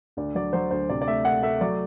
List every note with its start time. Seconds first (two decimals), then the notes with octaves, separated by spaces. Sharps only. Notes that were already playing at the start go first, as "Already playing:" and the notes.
0.17 D2 D5
0.35 F#3 D5
0.53 F#3 C5
0.71 D2 C5
0.90 C3 D5
1.02 D5
1.07 A3 E5
1.25 A3 F#5
1.43 A3 E5
1.61 F#3 D5